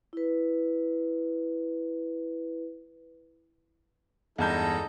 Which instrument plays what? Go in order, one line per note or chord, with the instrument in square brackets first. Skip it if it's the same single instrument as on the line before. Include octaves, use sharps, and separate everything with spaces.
[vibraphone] E4 B4
[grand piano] E2 G2 G6 [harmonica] G#3 D#4 A4